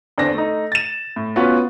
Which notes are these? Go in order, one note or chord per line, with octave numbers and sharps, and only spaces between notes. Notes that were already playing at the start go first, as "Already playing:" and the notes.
E2 D3 C4 D4 A#6
A3 D#4
A6 E7
A2
B3 C#4 F4 F#4 B4